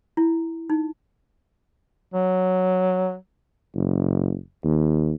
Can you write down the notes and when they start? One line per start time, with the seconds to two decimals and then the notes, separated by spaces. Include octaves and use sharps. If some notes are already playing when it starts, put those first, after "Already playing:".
0.17 E4
0.70 D#4
2.14 F#3
3.75 F#1
4.64 D#2